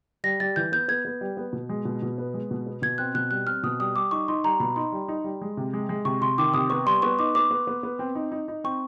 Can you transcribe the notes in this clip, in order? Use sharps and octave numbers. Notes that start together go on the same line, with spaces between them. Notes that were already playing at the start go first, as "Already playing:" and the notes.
G3 A#6
G3 A6
E3 G6
B3 G6
B3 G#6
B3
G3
B3
B2
G#3
B2
B2
B3
G#3
B2
B3
B2 G#6
C4 F#6
B2 F#6
G3 F#6
C4 F6
B2 D#6
G3 D#6
G3 D6
D#4 C#6
D#4 C6
G3 A#5
B2 B5
D#4 C6
G3
D#4
G3
G#3
C3
G#3
G#3
C3 C#6
C3 C6
D#3 D6
C3 D#6
B3 C#6
G3 C6
B3 C#6
D#4 D6
B3 D6
B3
B3
B3
C4
D#4
D#4
D#4
C4 C#6